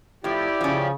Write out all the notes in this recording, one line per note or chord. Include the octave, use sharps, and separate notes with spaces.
A2 F3 E4 G4 D5
C#3 F3 C#4